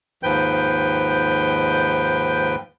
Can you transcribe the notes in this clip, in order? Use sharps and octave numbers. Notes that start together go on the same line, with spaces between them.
D#2 G#2 F3 B4 G5 G6